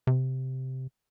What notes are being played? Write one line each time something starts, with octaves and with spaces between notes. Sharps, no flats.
C3